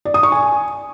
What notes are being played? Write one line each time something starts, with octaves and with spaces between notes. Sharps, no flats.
D5
D#6
C#6
G#5